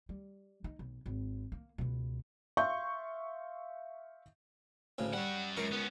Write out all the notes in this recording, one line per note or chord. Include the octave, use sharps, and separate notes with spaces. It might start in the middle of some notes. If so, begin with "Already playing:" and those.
G3
D#4
B1
G#1
A#3
C#2 B2
E5 F5 C6 C#6 G6
D2 A2 C#3
G3 C#4 F#5
C#2 F#2 A#4 C#6
B3 C#4